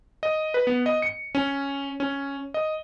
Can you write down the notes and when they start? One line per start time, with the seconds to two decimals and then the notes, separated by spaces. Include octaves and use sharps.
0.23 D#5
0.54 B4
0.67 B3
0.86 D#5
1.02 C#7
1.35 C#4
2.00 C#4
2.54 D#5